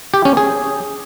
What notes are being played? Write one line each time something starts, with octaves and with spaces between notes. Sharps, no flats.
G4
C#4
G#4